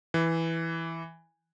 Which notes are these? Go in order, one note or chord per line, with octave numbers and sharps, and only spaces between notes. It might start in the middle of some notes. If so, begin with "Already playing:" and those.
E3